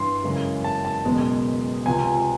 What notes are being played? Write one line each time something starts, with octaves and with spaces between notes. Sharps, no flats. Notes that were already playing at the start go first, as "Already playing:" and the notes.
Already playing: G2 E3 C6
F#2 C#3 E3 G#3
A5
A5
F#1 E2 B2 G#3
C#2 C3 F3 G#5